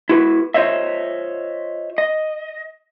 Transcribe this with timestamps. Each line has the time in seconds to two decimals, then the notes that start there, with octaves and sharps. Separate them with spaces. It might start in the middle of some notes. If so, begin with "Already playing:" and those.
0.09 E4 F#4 B4
0.54 F4 C5 C#5 D#5 E5
1.98 D#5